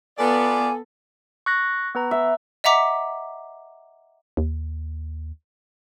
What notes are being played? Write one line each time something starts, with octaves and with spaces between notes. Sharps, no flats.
B3 F4 A4 B4 D5 G#5
C#6 F#6 A#6
B3 B4 A#5
E5
D#5 E5 F#5 A#5 D6 B6
D#2